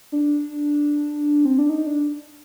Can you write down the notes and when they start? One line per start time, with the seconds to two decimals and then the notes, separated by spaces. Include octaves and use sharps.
0.12 D4
1.45 C4
1.58 D4
1.69 D#4
1.86 D4